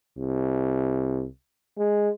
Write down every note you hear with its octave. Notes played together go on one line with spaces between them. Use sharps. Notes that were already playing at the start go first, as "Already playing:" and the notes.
C2
G#3